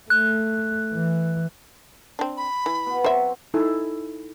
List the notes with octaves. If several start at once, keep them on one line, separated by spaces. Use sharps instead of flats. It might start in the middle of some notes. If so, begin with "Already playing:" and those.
A3 F#6
E3
C4 D4
B5
E3
B2
F#3 C4 C5 E5
D#4 E4 A4 G#5